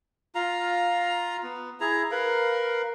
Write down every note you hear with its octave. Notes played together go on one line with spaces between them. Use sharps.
F4 F5 A#5
B3
E4 G#4 A#5
A#4 B4 F5